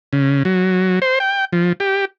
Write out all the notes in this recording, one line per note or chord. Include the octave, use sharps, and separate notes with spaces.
C#3
F#3
C5
G5
F3
G4